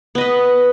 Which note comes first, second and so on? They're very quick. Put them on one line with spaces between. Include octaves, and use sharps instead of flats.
B3 D#5 B4